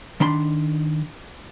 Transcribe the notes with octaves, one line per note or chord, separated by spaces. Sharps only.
D#3 D4 B5 C6